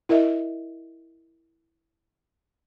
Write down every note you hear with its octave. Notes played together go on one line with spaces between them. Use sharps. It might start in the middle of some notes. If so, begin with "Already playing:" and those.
E4 A#4 D#5 E5